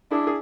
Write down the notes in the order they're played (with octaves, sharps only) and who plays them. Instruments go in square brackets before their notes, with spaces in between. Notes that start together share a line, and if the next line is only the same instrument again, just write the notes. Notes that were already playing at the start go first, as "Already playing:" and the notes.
[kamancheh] D4 [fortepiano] E4 G#4
[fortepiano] G#4